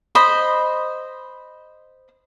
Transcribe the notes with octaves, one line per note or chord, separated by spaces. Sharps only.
C5 D#5 B5